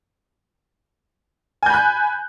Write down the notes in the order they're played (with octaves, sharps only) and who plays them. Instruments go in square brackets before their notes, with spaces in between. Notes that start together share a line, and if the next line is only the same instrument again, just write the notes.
[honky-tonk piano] G#5
G6
B5
F#6